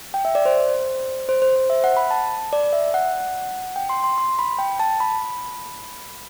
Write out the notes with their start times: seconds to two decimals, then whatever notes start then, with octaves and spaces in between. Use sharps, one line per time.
0.14 G5
0.25 E5
0.35 D5
0.45 C5
1.29 C5
1.42 C5
1.56 C5
1.70 E5
1.84 F#5
1.97 B5
2.11 A5
2.53 D5
2.73 E5
2.94 F#5
3.76 G5
3.90 C6
4.04 C6
4.18 C6
4.39 B5
4.59 G5
4.80 A5
5.00 B5